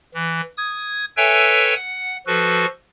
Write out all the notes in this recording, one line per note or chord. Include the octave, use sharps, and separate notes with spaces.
E3
D#6 G#6
A4 B4 C#5 E5 G5 G#5
F#5
F3 F#4 A4 B4